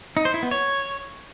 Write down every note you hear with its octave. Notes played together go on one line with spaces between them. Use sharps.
D#4
C5
E4
B3
C#5